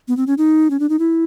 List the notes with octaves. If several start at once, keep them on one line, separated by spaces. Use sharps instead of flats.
B3
C4
C#4
D#4
C#4
D4
D#4
E4